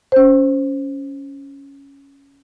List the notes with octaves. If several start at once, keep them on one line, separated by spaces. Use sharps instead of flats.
C#4 C5